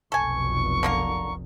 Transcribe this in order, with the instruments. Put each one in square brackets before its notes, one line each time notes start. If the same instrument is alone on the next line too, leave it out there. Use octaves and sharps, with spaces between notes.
[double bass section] F1 B1 B2 [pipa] A4 G#5 [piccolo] C#6
[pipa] D3 A#3 A#4